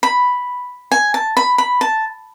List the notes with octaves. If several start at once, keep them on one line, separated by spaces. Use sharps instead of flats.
B5
G#5
A5
B5
B5
A5